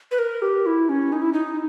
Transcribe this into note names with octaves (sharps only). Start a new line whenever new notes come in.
B4
A#4
G4
E4
C#4
D#4
E4
D#4